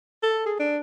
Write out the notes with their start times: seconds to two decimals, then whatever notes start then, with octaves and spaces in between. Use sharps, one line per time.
0.23 A4
0.46 G#4
0.59 D4